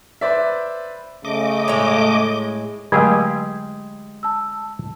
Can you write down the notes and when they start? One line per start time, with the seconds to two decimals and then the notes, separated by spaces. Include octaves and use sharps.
0.21 B4 C5 D5 E5
1.25 C#3 A3 D#5 D6
1.68 A2 G#3
2.92 D3 F#3 G#3 A3 G4 G#5
4.23 A5 E6